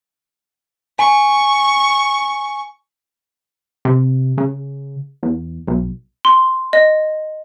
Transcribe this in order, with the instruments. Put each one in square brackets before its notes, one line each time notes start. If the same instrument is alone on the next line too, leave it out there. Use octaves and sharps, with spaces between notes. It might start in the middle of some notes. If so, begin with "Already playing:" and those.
[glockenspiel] G#5 [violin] C#6
[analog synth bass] C3
C#3
E2
B1
[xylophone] C6
D#5